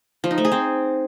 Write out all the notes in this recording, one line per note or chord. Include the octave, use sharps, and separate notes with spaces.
F3
D#4
A3
G#4
C4